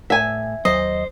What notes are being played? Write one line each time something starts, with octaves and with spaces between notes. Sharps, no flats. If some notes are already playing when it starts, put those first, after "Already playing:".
A2 E5 G#5
D#2 F#3 C5 D#5